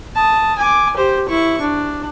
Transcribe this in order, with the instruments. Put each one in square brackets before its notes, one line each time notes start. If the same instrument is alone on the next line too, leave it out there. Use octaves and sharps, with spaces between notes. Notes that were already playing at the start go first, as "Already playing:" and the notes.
[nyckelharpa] A5 D#6
G#5 D6
G4 C5
E4 C#6
D4